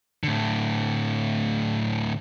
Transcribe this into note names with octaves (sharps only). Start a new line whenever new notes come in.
A2 D3